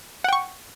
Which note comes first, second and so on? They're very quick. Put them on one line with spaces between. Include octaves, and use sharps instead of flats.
F#5 G5 C#6